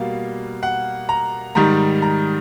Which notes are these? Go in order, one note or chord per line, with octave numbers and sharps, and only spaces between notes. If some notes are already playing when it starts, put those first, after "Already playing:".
Already playing: B2 G3 A#3 F5
F#5
A#5
G#2 D#3 G3 A#5
A#5